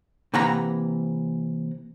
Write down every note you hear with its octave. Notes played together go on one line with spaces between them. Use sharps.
C3 E3 A#3 F#5 A#5 B5